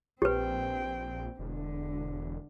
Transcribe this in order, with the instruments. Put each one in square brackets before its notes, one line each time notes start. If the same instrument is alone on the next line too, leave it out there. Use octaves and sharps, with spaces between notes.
[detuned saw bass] A#1 [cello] C4 G5 [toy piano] G4 B4
[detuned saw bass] E1 [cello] D3